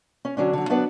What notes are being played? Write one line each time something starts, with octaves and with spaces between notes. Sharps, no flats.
C#4
D3 F#3 C#4 D4
D3 F#3
F#3 B3 D4 B4 D5 F#5